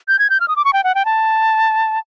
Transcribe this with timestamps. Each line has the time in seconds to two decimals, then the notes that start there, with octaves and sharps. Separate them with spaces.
0.08 G6
0.19 G#6
0.30 G6
0.40 F6
0.48 D#6
0.56 D6
0.65 C#6
0.73 G5
0.84 F#5
0.95 G5
1.05 A5